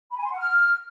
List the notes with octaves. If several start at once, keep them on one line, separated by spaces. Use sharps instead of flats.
B5
G#5
C6
F#5
F6